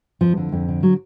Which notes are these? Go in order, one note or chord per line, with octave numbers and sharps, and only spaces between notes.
F2 F3
D3
F2
D3
F#3